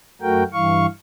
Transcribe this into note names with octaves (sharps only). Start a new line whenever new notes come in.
F#2 A3 F#4 A#4 G5
G2 E3 F5 C#6